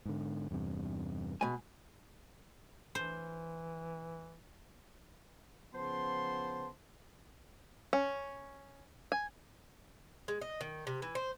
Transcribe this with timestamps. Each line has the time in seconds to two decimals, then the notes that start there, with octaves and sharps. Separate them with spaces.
0.06 G#2 D3
0.51 E2 G2 C3
1.41 B2 G#3 G#5
2.95 E3 C5
5.74 C#3 F3 B3 C5 A5 C6
7.93 C#4
9.12 G#5
10.28 G#3
10.42 D#5
10.61 D#3
10.87 C3
11.02 E3
11.15 C5